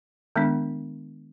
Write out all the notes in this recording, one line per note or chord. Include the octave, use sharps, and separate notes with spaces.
D#3 G#3 B3 D4